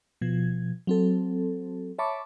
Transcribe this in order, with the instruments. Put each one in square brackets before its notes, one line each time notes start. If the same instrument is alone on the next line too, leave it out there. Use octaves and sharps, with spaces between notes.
[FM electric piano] B2 F3 G#6
F#3 C4 A4
C#5 E5 A5 B5 C#6 D6